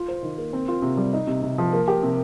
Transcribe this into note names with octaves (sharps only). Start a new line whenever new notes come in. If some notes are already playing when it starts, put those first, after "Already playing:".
Already playing: F4
C5
D#3
A#3
C4
F4
C3
G3
D#4
C3
C3
F3
A#3
G4
C3